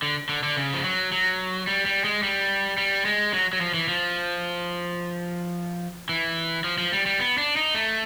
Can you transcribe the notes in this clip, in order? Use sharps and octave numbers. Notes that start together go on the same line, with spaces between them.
D3
D3
D3
C#3
F3
F#3
F#3
G3
G3
G#3
G3
G3
G#3
F#3
F#3
F3
E3
F3
E3
F3
F3
G3
G3
B3
D4
D#4
A3